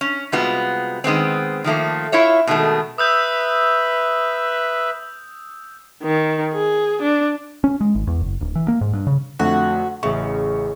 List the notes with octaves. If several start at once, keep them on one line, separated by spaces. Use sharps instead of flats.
C#4
C3 G3 G#3 B3 F4 F#4
D#3 G#3 B3 C4
D#3 F3 A3 A#3
E4 F4 C#5 E5
B2 D#3 G#3 A3
B4 E5 D#6 E6 G6
D#3
G#4
D4
C#4
G#3
G#1
E2
F#1
D1
E3
A#3
G#2
G2
C#3
F2 D3 A3 F#4
A1 C#3 E5 C#6